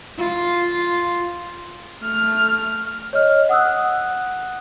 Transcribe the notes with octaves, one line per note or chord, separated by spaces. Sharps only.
F4
A3 F6
C#5 D#5 F6
F#5 D#6 E6 F#6